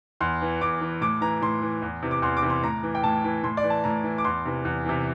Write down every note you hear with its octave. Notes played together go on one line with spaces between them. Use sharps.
E2 C6
E3
E2 D6
E3
A2 D6
E3 A#5
A2 C6
E3
E2
C3 E3
D6
E2 C6
D6
C3 E3
C6
A2 A#5
E3
G5
A2 A5
E3
A2 C6
D5
E3
A5
A2 A#5
E3
D6
E2 C6
C3 E3
E2
C3 E3